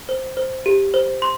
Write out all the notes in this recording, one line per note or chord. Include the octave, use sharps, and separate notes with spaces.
C5
C5
G4
C5
C6